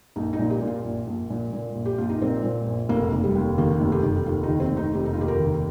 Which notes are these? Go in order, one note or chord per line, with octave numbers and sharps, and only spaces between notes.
A#1 D#4
D#4
A#2
G4
A#2
F4
A#1
A#1
A#2
A#2
A#1
G4
A#1 F4
D#4
A#2 C4
A#2
A#1
F1 A#3
F1
G3
D#2
D#3 A#3
F1
G4
F1
D#2 F4
D#4
D#3
C4
F1
D#4
F1 G4
D#4
F4
D#2 G4
A#4
D#3